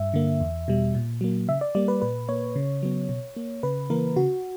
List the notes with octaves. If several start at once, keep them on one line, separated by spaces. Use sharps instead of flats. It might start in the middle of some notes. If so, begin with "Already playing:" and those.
Already playing: G2 E5
D3 A#3
E2
B2 G3
A#2
F#3 A#3
C#3 E5
D5
G3 A#3 D5
B4
A#2 B4
A#3 C#5
C#3
F#3 B3
B2
A#3
C#3 B4
E3 A#3 A#4
C#3 F#4